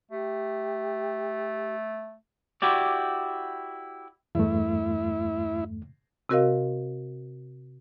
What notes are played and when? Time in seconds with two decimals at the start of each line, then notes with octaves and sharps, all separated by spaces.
0.11 A3 G4
2.62 E4 F#4 G4 D5
4.35 E2 G2 A3 E4
6.29 C3 C4 F#4 A#4 D#5 F5